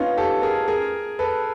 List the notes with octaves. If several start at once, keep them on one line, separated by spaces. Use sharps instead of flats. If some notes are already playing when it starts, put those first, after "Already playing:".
Already playing: B3 C#4 D#4 F4
G4 A4
G#4 A#4
G#4 A#4
A4 B4